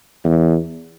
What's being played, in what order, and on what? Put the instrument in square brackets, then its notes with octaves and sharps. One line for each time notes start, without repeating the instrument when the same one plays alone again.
[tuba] E2